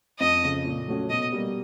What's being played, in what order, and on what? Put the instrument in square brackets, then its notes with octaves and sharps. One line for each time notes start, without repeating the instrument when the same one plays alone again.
[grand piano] F2 [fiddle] D#5
[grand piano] C#3 F3
A#2
F#3 A3 C#4 F#4
[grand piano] B2 [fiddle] D#5
[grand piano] G3 A#3